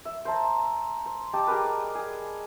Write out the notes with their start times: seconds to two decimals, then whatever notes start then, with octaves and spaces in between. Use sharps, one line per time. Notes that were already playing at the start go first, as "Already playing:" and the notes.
0.05 E5
0.25 C5 E5 A5 A#5
1.06 C5
1.33 G4 D5 D#5 A5
1.47 G4 G#4 A#4 B4
1.95 G#4